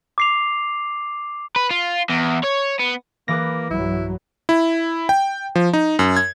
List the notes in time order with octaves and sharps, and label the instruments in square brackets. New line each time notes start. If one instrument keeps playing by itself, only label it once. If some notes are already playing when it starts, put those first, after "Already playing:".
[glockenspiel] D6 C7 F7
[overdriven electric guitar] B4
F4
E2
C#5
B3
[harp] E3 G#4 B4 [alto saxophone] A#3 [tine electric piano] D6 A#6
[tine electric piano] B1 [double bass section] G2 F#3 [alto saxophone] E4
[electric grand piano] E4
G5
F3
D#4
F#2
G#6